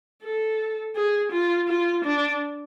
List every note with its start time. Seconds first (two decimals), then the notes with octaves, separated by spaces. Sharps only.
0.23 A4
0.95 G#4
1.32 F4
1.68 F4
2.04 D4